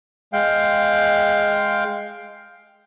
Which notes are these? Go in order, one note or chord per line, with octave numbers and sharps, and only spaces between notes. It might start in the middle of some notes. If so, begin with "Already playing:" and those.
G#3 F5 G5